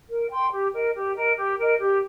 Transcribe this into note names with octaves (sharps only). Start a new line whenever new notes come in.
A#4
G5 C6
G4
A#4 D#5
G4
A#4 D#5
G4
A#4 D#5
G4